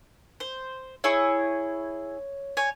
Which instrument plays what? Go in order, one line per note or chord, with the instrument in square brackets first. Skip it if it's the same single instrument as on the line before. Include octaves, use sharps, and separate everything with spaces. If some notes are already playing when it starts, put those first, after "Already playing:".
[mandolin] C5
[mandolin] E4 G#4 C#6 [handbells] C#5
[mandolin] C#5 G#5